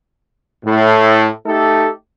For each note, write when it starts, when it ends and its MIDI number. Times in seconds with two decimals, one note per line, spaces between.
0.65 1.29 45
1.46 1.90 57
1.46 1.90 63
1.46 1.90 67
1.46 1.90 69